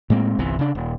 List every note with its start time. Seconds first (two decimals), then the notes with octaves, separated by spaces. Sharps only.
0.10 A2 G#3 A#3 C4
0.39 G1 C2 C3 E3
0.59 C#3 D4
0.75 D#1